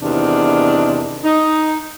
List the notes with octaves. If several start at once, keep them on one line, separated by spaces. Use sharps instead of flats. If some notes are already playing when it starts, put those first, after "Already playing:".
E2 C3 D#3 D4
D#4